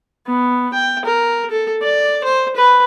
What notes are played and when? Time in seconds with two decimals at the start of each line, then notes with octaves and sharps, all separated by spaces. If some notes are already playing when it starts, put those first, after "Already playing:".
0.27 B3
0.73 G5
1.05 A#4
1.50 A4
1.82 D5
2.24 C5
2.56 B4